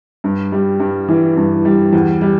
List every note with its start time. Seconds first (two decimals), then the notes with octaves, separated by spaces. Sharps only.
0.24 G2
0.52 G3
0.80 G2
1.09 E3
1.37 G2
1.65 G3
1.93 E2
2.21 G3